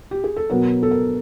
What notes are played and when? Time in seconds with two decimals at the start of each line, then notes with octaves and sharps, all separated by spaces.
0.11 G4
0.24 G#4
0.36 A4
0.50 B2 F#3 B3 A#4
0.83 A4
0.91 A#4